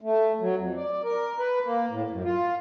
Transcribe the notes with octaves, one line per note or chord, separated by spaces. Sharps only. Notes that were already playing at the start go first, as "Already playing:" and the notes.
A3
F#3
F2
D5
A#4
B4
A#3
A2
F#2
F4